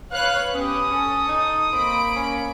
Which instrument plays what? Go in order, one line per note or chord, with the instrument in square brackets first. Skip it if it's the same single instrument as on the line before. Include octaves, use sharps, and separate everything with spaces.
[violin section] B4 C#5 F#6 [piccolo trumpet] F5
[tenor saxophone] B3 [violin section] C#4 G4 [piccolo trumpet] D#6
[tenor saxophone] C#4 [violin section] A4
[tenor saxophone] D#4
[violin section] A#3 B5 D7 [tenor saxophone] C4
[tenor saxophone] C#4